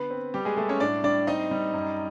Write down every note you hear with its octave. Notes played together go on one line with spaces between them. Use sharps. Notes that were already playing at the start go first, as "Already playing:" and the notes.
Already playing: D3 B3 B4
C4
G3 B3 G4
G#3 G#4
G3 A3 A4
C#4 C#5
A2 D4 D5
G3 D4 D5
C4 D#4 D#5
G3
F#2